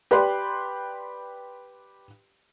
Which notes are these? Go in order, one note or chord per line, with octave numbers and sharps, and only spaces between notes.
G4 B4 D5 G5 B5 C6